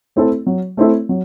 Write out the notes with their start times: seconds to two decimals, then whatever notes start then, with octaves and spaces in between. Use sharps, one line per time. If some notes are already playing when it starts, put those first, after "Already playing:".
0.16 A3 C4 E4 A4
0.47 F#3
0.77 A3 C4 E4 A4
1.09 F#3